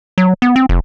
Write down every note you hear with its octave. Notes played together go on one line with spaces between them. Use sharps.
F#3
B3
C4
F1